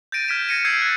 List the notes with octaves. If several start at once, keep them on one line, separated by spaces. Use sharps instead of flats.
G6 A6 A#6 D7 D#7
F6 G#6 B6 D7 E7
G#6 A#6 C#7 D#7
E6 G6 G#6 C7 D7
F#6 A6